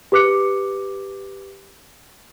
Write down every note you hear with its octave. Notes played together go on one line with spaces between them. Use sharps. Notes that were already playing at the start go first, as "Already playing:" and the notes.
G4 B4 D6 F#6 C#7